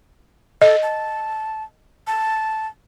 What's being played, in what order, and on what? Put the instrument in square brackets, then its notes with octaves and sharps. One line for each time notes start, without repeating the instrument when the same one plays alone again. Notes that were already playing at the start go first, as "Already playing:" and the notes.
[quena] A4 [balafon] D#5
[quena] A5
A5